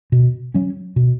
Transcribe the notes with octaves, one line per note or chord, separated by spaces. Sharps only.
B2
F#3 C#4
B2